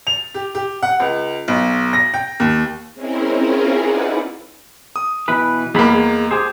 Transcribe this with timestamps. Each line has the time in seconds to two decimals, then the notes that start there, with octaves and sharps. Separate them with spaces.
0.07 F7
0.34 G4
0.55 G4
0.83 F#5
1.00 C#2
1.48 B1
1.93 A#6
2.14 G5
2.40 D#2
2.94 G#3 C4 C#4 E4 A#4
3.35 C4 C#4 E4 F4 G#4 A#4
3.79 D#4 E4 G#4 B4 D5 F#5
4.96 D#6
5.28 B2 E3 B4
5.75 E2 G#3 A#3 B5
5.94 G#3
6.31 G4 G#4 C5